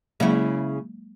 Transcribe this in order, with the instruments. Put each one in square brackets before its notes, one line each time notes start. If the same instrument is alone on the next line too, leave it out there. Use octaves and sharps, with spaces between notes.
[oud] C#3 E4 [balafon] F#3 G#3 A#3